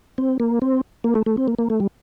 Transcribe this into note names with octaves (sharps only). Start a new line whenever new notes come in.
C4
A#3
C4
A#3
A3
A3
C4
A#3
A#3
A3
G3